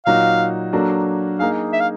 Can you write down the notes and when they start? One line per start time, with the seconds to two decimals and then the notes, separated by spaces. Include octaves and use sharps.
0.06 A#2 F#3 A#3 D#4 F#4 F5
0.73 F#3 A#3 D4 F#4 A4
1.39 A#3 D#4 G#4 F5
1.73 E5
1.80 F5